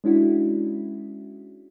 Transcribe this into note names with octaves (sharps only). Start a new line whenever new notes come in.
G#3 C#4 D4 E4 F#4